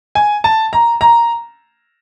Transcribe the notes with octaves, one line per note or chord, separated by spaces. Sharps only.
G#5
A5
A#5
A#5